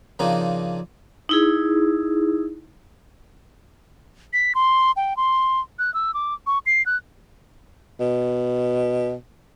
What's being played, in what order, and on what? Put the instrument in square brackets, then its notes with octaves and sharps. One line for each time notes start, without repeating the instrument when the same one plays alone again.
[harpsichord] C#3 F3 A#3 C4 D4 D#4
[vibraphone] D#4 E4 G#4
[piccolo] B6
C6
G5
C6
F#6
E6
D6
C#6
C7
F#6
[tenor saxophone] B2